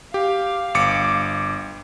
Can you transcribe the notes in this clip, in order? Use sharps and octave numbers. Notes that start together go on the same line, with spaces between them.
G4 F5
G1 D6 C#7